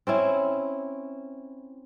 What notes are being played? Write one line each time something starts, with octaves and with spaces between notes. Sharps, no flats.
C4 C#4 E4